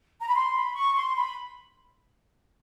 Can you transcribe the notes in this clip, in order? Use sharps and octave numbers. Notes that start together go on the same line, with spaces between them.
A#5
B5
C6
B5
C#6
C6
B5